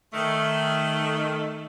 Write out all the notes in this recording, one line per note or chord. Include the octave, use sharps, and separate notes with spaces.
D#3 A3